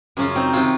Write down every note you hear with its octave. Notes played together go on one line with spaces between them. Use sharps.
F#2 C#3 C#4 F4
C4 D#4
C3 D#3 C#4 F4